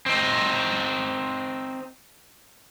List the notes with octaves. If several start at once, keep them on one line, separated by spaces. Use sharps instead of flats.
C4 D#4